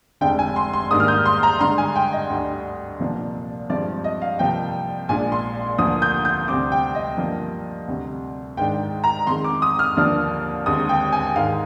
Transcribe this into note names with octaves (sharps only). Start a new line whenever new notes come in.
F1 F2 D3 G#3 D4 G5
G#5
C6
C6
G#2 D#3 G3 A#3 D4 D#6
F6
G6
C6
A#5
G2 D3 G#3 C6
G#5
G5
D#5
D2 D3 G3 D4
C2 A#2 F3 A#3 D4
G2 F3 G#3 C4 D5
D#5
F5
C2 C3 F3 A#3 G5
A#1 A#2 G#3 D4 G#5
C6
D2 D3 F3 A#3 D#6
G6
G6
D2 C3 G3 C4 D6
G5
D#5
G2 F3 A#3
D2 C3 G3
G#2 D#3 G#3 D4 G5
A#5
F2 D#3 G#3 C6
D6
D#6
F6
D#2 D3 F3 A#3 D4
D#2 D3 G#3 C4 D#6
G5
G#5
G#2 D#3 G#3 F5